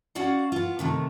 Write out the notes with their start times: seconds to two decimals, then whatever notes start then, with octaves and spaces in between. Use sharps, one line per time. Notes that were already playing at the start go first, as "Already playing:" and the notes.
0.15 C#4 F#4 D5 F5 F#5
0.52 B3 F4
0.79 C3 D#3 A3